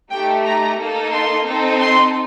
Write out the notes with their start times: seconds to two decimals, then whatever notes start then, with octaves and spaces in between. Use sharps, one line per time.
0.10 A3 D#4 G4 G5
0.44 A#5
0.78 A#3 D#4 A4
1.12 C6
1.46 C4 D#4 A4
1.80 C6